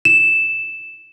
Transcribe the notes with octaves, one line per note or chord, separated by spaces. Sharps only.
E7